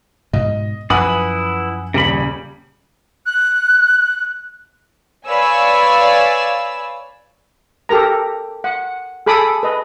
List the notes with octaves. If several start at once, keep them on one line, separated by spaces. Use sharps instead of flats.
G#2 B2 D#5
F#2 F3 E4 B4 F#5 G#5 B5 D#6
D#1 C#3 G3 B5
F#6
B4 C#5 D5 F5 G#5 E6
G4 A4 A#4 A#5
F#5
G#4 A4 B5 D6 D#6
B4 D#5